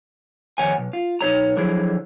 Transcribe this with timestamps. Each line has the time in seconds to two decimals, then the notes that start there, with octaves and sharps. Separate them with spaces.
0.58 F2 D#3 C#5 F#5 G#5
0.78 B1
0.93 F4
1.21 B1 D#4 C#5 A#5
1.57 D3 F3 F#3 E4 G#4